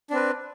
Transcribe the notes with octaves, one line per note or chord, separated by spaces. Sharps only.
C4 D4 B4